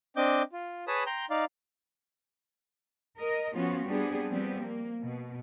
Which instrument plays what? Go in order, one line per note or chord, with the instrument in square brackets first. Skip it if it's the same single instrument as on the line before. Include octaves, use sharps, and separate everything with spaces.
[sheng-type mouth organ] C4 D4 D#5 D6 G6
F4
G#4 B4 C#5 A5 B5 D#6
G5 A#5 C6
D#4 D5 F5
[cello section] A#4 D#5
F3 B3 C#4 F4 F#4
G3 B3 C4 D4 G#4
F3 G3 B3 C4
A#3
B2